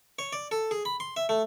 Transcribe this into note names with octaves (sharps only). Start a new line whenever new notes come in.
C#5
D5
A4
G#4
B5
C6
E5
A3